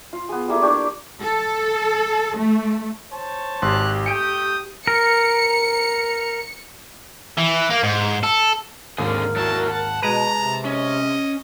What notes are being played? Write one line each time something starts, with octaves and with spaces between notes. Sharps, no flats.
F4
B3 G#4
G3 A#3 E4 A4
D4 G4 D5 C#6
A4
A3
C5 C#5 A5
G#1 G4 C6 F#6
A3 G5 D#6 C#7 D7
A#4 C#7
E3
A#3
G#2
A4
G#1 D#2 D3 C4 G#4 A#4
F#3 E4 F#4 A5
F#5 A5
B2 G#3 B4 A#5
C3
C#4 D#5